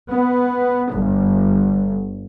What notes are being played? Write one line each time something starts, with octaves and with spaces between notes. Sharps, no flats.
B3
G1